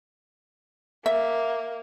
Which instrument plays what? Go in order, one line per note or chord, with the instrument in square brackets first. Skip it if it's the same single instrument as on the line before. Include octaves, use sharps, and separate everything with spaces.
[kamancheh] A#3 [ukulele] E5